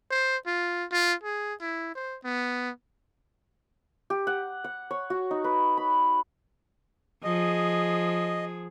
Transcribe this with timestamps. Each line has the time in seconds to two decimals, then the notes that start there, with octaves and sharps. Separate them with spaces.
0.11 C5
0.47 F4
0.92 F4
1.24 G#4
1.61 E4
1.95 C5
2.24 B3
4.10 G4
4.27 F#5
4.64 F#5
4.91 C#5
5.10 F#4
5.31 D#4
5.44 B4
5.77 B5
7.24 F3 G#4 D#5